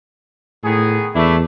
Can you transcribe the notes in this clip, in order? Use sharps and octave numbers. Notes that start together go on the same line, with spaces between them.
A2 D#3 B3 G#4
E2 A3 D4 E4